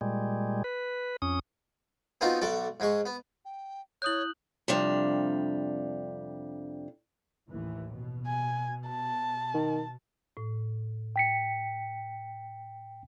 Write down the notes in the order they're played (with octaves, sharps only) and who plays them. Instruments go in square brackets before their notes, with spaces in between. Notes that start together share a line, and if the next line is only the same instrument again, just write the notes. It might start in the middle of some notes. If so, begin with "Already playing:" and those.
[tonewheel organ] A#2 G3 G#3
B4
F2 C#4 D#6
[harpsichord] B3 C4 D#4 F4 F#4
B1 F#4 A4 D5
G#2 G#3 C#6
B3
[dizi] G5
[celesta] E4 D#6 G6 [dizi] C#5 [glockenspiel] F#6 F#7
[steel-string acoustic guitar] F2 C3 G3 D4 F5
[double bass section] A1 D#2 E3
B2
[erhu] G#5
A5
[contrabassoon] D#3
[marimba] A2
[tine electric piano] G5 B6 C#7